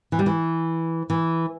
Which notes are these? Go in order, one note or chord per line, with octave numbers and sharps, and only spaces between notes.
E3
G3
E3
E3